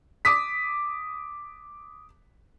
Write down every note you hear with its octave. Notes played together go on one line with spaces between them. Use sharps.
D6 D#6 B6